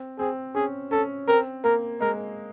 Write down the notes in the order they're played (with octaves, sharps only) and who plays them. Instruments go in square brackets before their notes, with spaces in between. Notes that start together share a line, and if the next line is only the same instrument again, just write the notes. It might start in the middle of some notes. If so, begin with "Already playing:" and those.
Already playing: [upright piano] C4
[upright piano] C4 [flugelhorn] G#4
[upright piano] C#4 [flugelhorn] G#4
[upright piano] C#4 [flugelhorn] A4
[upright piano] C4 [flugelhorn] A#4
[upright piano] A#3 [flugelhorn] A#4
[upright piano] G#3 [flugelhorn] A#4